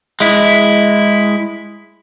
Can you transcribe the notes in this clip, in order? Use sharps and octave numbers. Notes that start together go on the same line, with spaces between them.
G#3 E4